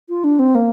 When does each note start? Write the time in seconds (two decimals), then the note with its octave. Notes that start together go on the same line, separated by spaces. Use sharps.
0.09 F4
0.24 D4
0.39 C4
0.55 A#3